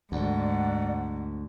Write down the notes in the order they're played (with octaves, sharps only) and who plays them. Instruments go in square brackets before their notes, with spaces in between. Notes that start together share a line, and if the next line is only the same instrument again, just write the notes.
[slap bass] D2 [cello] G#2 [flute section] D5 F#5